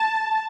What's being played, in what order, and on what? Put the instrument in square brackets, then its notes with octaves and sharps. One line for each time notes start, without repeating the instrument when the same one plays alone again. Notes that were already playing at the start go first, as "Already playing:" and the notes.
Already playing: [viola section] A5